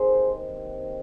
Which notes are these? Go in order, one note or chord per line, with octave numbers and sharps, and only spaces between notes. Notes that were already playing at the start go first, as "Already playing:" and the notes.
Already playing: D#2 D#3 C4 G#4 C5